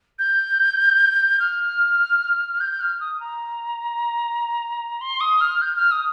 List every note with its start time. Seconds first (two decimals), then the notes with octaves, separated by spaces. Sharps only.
0.19 G6
1.40 F6
2.60 G6
2.81 F6
3.00 D#6
3.20 A#5
5.01 C6
5.21 D#6
5.41 F6
5.62 G6
5.76 F6
5.91 D#6